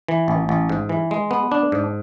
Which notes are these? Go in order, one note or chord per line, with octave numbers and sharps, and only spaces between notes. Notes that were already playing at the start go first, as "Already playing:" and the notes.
E3
A1
A1
G#2
E3
G#3
B3
D4
G#2